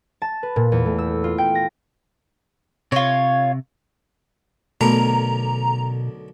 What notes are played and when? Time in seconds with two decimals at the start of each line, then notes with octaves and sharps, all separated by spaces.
0.22 A5
0.43 B4
0.56 A#2
0.72 E2
0.86 A3
0.98 E6
1.24 F4
1.38 G5
1.55 A#6
2.92 C3 F4 C#5
4.81 B1 B2 D3 A3 B3 A#4 A#5